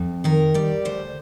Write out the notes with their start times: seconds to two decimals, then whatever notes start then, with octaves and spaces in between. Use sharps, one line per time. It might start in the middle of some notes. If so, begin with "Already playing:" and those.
Already playing: F2
0.24 D#3 A#4
0.54 G3 D5
0.85 D2 C5